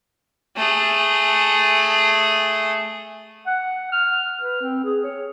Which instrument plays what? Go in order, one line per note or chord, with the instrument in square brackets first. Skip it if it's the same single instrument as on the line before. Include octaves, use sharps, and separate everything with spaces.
[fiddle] A3 G#4
[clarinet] F#5
F6
B4
C4
G#4
C#5